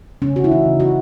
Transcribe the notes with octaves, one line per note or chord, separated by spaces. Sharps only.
C#3 C#4
A3 F#4
E4
E3 D#4
C#3
C#3 F#4